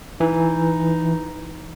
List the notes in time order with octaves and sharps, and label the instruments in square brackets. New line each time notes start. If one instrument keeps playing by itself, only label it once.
[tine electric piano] E3 [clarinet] D#4